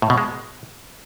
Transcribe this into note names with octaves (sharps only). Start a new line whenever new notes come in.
A2
B2
G#3